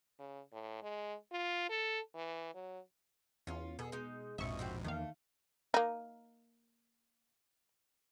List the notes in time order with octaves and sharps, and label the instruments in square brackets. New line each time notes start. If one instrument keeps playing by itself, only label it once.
[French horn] C#3
A2
G#3
F4
A4
E3
F#3
[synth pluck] E2 [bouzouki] C#4 F4
[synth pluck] B2 [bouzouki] G#4 A4
[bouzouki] G#3 D#4
[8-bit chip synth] A#1 G#2 [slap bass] F2 B2 F3 [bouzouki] D#5 [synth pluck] E5 C#6
[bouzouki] C4 F#4 G4
[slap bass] E2 A#3 [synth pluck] D#3 F5 [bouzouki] A3
[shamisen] A#3 D#4